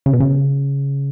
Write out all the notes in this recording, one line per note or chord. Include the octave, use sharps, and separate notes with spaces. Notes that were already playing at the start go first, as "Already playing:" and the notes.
C#3
B2
C#3